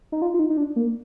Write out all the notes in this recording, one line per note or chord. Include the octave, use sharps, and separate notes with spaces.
D#4
F4
F4
D#4
D#4
D4
A#3